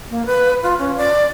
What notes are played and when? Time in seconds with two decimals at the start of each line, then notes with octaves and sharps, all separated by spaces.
0.10 A#3
0.26 B4
0.63 F4
0.79 C#4
0.97 D5